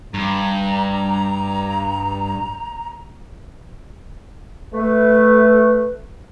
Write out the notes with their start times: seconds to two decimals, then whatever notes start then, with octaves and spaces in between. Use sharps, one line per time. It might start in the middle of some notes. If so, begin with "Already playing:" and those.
0.14 G2 A#5
4.73 A3 B4